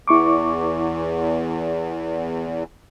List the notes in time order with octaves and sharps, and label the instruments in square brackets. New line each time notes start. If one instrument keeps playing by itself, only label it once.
[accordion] E2 [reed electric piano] E4 C#6 D6